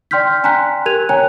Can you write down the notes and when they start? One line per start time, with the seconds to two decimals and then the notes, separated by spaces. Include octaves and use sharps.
0.11 D5 G5 C6 F6 G6 B6
0.44 G5 G#5 A#5 C6 F#6 B6
0.86 G4 A#4 F#6 G#6 D#7 F7
1.09 C#5 G5 G#5 A#5 F#6